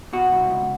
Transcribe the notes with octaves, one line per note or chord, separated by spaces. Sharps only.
B2 F#4
C2
C#2